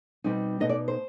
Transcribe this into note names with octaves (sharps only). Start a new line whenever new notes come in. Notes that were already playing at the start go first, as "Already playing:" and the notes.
B2 G3 C4 D#4
B2 B3 D#4 D#5
D5
C5